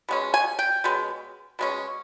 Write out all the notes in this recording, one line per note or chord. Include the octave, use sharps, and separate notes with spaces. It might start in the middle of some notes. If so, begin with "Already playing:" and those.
B2 G#3 C#4
G#5
G5
B2 G#3 C#4
B2 G#3 C#4